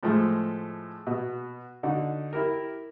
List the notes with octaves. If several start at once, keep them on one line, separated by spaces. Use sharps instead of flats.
A2 F3 G#3 A3
B2
D3 D#4 F#4
E4 G4 A#4